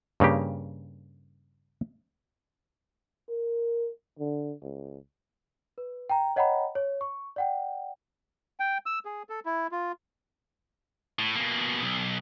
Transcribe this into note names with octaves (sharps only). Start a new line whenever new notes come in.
G2 C#3 A#3 G4
A#4
D3
C#2
B4
G5 A#5
C#5 D#5 F#5 G5 A#5 B5
C#5
C#6
D5 F#5 G5
G5
E6
G#4
A4
E4
F4
A2
B2 A#3
B1